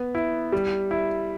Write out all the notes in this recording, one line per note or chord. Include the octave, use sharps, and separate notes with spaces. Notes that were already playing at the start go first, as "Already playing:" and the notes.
Already playing: B3
E4
G3
E4